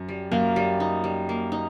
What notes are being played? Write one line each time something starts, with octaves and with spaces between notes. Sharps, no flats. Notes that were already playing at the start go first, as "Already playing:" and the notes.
Already playing: F#2
G3
F#2 A#3
G3
D#4
G3
A#3
D#4